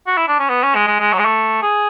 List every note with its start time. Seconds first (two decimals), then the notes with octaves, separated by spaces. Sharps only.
0.07 F#4
0.17 E4
0.28 D4
0.39 C#4
0.49 B3
0.63 C#4
0.75 G#3
0.87 G#3
1.00 G#3
1.13 F#3
1.19 G#3
1.25 A3
1.63 G#4